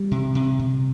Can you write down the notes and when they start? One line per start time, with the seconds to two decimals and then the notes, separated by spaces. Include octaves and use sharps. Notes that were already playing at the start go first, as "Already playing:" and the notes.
Already playing: G3
0.11 C3
0.35 C3
0.59 C3